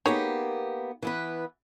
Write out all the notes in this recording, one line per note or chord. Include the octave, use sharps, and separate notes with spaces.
A#3 B3 D#4 G4 G#4 C#5
E3 B3 B4